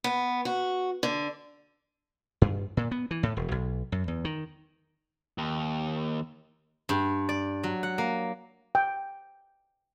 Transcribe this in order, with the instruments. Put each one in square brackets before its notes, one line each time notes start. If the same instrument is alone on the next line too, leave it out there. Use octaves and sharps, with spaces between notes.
[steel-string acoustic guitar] B3
F#4
D3
[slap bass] G2
A#2
B3
E3
A2
E1
B1
F#2
E2
D#3
[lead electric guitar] D#2
[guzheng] G2
D5
F#3
F#5
A#3
[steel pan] G5